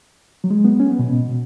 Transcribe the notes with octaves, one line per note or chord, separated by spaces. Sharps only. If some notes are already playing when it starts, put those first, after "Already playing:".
F#3
G#3
B3
C#4
B3
B2
B2